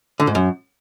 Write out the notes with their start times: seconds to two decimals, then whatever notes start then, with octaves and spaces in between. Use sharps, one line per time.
0.20 D3
0.27 G#2
0.35 F#2